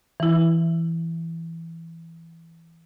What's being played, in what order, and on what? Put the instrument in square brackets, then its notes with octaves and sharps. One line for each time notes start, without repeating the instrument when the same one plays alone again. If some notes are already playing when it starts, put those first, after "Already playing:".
[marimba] E3 E4